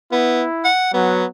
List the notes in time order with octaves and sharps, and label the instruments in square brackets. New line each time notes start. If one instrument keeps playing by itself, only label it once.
[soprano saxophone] B3 [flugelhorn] E4
[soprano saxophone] F#5
[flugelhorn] F#3 [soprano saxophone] B3